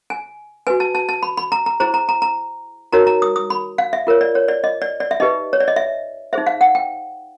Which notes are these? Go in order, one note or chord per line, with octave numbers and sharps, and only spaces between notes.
G#5
F#4 B4 G#5
A5
A5
A5
B5
B5
A#5
A#5
E4 G#4 C5 A#5
A#5
A#5
A#5
D#4 F#4 A#4 C#5 A#5
A#5
D#6
D#6
B5
F5
E5
F4 A#4 C#5
D5
C#5
D5
D#5
D5
D5
E5
D#4 G4 B4 D#5
C#5
D5
D#5
E5
D#4 G#4 C5 E5
F5
F#5
G5